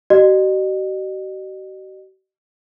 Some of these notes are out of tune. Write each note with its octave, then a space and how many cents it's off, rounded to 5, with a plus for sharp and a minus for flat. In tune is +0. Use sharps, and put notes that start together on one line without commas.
F#4 +45 D#5 -40